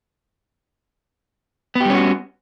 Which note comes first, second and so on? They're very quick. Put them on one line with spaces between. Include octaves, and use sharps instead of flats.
B3 G4 G3 C#4 F#4